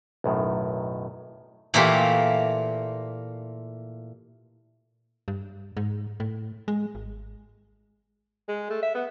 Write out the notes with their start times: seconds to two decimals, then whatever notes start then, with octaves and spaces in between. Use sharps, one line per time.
0.24 B1 F#2 A2 D#3
1.74 A#2 E3 A3 A#3 F4 G4
5.28 G2
5.77 G#2
6.20 A2
6.68 G#3
6.95 G#1
8.48 G#3
8.70 A3
8.82 E5
8.95 B3